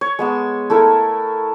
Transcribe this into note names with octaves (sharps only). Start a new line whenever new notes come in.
C#5
G#3 B3 A5
A3 E4 A4 A#4